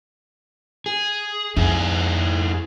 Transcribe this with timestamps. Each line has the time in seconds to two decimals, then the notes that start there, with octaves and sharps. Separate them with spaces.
0.86 G#4
1.56 F2 D#4 E4 G#4